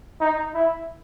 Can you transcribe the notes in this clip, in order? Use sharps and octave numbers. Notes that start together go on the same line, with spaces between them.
D#4
E4